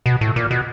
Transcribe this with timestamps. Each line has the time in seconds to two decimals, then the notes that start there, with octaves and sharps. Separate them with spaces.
0.06 B2
0.21 A2
0.36 A#2
0.51 B2